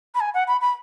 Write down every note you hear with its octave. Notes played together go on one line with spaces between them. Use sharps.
B5
G#5
F#5
B5
B5